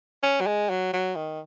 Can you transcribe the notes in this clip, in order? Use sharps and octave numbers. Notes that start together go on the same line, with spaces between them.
C#4
F#3
G#3
F#3
F#3
D#3